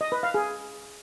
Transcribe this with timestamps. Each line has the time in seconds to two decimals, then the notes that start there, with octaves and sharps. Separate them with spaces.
0.01 D#5
0.12 B4
0.23 F5
0.34 G#4